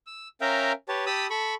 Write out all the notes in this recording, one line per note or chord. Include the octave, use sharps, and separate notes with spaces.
E6
C#4 A#4 E5 F5 G5 A#5
G4 B4 C#5 A5
G4 A5 B5 D#6 E6
A4 B5 C#6